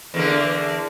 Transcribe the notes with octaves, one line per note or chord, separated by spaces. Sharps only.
E2 D3 A#3